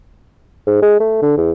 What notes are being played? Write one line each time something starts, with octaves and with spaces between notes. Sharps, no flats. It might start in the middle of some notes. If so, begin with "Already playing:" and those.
G#2
G#3
A3
D3
E2